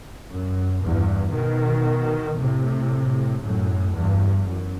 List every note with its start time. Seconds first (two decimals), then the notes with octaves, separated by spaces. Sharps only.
0.29 F#2
0.82 E2 G2
1.33 B2 D#3
2.37 A2 C3
3.42 F#2 A2
3.95 E2 G2
4.46 F#2